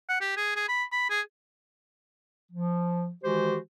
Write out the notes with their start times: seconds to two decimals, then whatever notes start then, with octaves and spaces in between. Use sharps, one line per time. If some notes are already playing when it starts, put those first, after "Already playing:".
0.09 F#5
0.21 G4
0.37 G#4
0.56 G#4
0.68 B5
0.92 B5
1.10 G#4
2.52 F3
3.24 D#3 E3 G#3 F#4 G4 C5